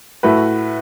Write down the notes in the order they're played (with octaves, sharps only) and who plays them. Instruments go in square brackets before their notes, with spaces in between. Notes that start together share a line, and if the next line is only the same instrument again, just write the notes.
[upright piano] A2 A3 F#4 B4